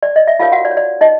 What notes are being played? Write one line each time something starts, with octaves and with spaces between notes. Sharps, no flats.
D5
D#5
E5
D#4 F4 G4 A#4 C#5 F5
F#4 F#5
D5
C#5
D5
D#4 D#5